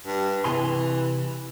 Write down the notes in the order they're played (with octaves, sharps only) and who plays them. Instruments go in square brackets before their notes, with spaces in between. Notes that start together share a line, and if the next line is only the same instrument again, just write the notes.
[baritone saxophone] G2
[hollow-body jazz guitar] C3 G#5 C6 [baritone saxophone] E3